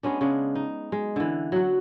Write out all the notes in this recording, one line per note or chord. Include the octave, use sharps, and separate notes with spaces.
G#3 B3 C#4 D4
C#3 G#3 D4
D#4
G#3
D3 E3
F#3 F#4